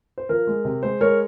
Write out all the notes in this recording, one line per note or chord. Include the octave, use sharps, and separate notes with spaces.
C5
F3 A#4
G#3
C3
G#3 C5
G#3 A#4 C#5